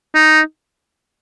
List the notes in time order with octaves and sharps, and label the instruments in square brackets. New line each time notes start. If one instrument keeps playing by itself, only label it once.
[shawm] D#4